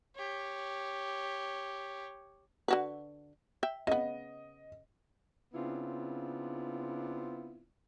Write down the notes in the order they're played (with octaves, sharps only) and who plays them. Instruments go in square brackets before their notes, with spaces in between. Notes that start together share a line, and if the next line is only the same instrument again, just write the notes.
[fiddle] G4 C#5
[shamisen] D3 F#4 B4
E5 G5
[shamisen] C#3 B3 [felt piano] D#5
[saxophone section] C#3 B3 C4 D4 E4 F4